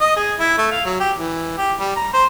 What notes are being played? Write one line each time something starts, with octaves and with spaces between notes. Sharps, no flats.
D#5
G#4
E4
A3
F5
F#3
G4
E3
G4
G3
A#5
C5